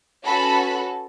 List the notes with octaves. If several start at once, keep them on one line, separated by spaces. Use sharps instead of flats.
C#4 F#4 A4 B4 B5